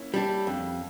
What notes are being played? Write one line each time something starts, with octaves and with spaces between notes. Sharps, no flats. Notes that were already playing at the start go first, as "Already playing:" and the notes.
Already playing: A#3 C#4 E4
G3 D4
F2